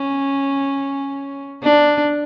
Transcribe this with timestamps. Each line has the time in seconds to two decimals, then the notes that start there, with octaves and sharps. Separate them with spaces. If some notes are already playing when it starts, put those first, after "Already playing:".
Already playing: C#4
1.63 D4